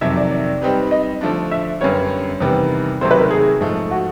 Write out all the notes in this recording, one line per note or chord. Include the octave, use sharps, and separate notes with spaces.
F2 C3 D#3 F#3 E5
D5
D5
G3 C4 D#4 G4 B4
D#5
D3 F3 A3 D4
E5
F#2 D3 G3 B3 C#5
E2 C3 D#3 G3 B3
C3 D#3 F#3 A3 C5
B4
A#4
G#4
G#2 F3 A3
F#4